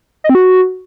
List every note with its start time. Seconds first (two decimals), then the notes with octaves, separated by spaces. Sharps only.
0.24 D#5
0.29 C4
0.35 F#4